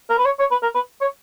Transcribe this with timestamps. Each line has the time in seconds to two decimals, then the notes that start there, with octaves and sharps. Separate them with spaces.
0.10 A#4
0.18 B4
0.25 C#5
0.39 C#5
0.51 B4
0.63 A#4
0.75 B4
1.01 C#5